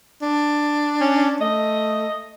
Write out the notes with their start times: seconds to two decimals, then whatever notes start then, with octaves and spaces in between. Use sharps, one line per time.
0.22 D4
1.00 C#4
1.41 A3 D#5